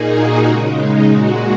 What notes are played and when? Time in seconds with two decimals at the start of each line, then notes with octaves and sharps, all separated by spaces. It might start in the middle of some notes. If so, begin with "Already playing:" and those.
Already playing: A#2 A#3 D#4 G#4
0.12 F#4
0.44 C#3 G#3
0.77 D#4
1.08 A#2 G#3 F#4